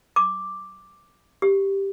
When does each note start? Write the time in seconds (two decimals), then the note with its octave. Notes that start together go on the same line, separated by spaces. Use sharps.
0.16 D6
1.42 G4